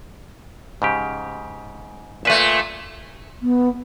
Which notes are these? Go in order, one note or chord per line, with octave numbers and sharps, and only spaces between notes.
G#2 C#3 G4
A#2 A3 B4 E5
B3